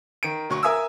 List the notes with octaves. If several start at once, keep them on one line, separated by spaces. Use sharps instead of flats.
D#3 D7
D2 F#3 C#6
A#4 E5 G#5 D#6 E6